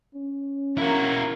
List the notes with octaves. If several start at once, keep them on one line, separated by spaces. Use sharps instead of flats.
C#4
A#3 E4 F#4